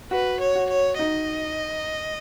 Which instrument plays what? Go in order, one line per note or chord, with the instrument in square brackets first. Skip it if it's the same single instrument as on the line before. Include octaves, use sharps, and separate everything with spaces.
[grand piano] F#4 [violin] B4
[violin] C#5
[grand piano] F#4
[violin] C#5
[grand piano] D#4 [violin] D#5